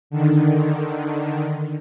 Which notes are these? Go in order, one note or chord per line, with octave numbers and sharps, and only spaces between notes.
D3 D#3